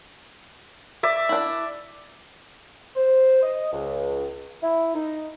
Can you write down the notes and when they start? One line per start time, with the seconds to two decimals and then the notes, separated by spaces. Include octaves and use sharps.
1.03 D5 E5
1.29 D4 E4
2.96 C5
3.42 D#5
3.72 C#2
4.62 E4
4.94 D#4